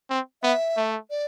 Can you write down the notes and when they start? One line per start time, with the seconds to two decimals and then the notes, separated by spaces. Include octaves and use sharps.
0.10 C4
0.43 B3 E5
0.77 A3
1.10 D5